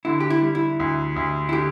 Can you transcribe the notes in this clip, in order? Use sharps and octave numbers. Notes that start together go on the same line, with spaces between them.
D3 E4
G4
E4
G3
E4
D2
D2
E4
D3 G4